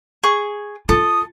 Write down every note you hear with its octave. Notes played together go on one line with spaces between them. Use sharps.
G#4 C#6
F4 A4 D#6